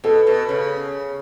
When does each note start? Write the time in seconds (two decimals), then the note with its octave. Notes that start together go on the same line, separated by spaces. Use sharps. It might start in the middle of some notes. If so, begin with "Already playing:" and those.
0.04 B2 A4
0.27 B2
0.49 C#3